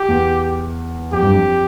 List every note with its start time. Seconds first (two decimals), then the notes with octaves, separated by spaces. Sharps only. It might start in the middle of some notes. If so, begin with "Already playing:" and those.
Already playing: G4
0.08 E2
1.12 F2 G4
1.22 G2
1.33 F2